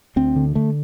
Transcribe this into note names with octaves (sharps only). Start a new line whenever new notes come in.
D2 C4
D3
D3 A3